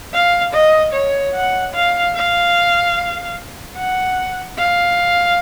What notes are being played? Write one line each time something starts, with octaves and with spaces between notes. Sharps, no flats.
F5
D#5
C#5
F#5
F5
F5
F#5
F5